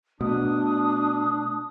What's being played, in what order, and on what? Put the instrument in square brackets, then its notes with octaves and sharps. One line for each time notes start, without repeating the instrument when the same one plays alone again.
[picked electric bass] B2 [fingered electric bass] A3 B3 [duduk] D4 [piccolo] D#6